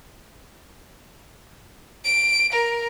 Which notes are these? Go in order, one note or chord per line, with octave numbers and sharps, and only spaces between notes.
D7
A#4